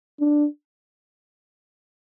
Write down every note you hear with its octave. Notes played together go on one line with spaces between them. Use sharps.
D4